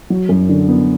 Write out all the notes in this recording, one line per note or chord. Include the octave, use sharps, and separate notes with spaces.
F#3
F#2
D3
B3